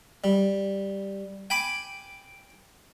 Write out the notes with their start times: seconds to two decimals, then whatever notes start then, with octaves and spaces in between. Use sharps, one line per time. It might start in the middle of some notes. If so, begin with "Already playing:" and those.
0.24 G3
1.50 G5 G#5 B5 D6